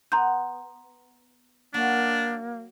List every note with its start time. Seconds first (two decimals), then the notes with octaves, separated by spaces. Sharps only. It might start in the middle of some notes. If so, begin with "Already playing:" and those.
0.12 B3 A#5 C6 G6
1.74 F#3 A#3 D4